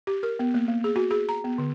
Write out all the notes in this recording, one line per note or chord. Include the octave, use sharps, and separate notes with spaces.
G4
A#4
B3
A#3
A#3
G#4
F#4
G#4
A#5
B3
D3